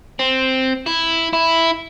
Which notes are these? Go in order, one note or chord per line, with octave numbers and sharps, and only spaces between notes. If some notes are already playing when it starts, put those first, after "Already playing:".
C4
E4
E4